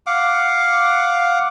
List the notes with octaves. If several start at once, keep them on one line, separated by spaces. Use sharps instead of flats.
F5 F#5 D6